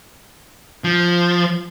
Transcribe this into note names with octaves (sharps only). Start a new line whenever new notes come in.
F3